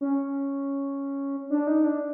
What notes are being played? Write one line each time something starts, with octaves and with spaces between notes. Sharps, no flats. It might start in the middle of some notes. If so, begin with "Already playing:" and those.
C#4
D4
D#4
D4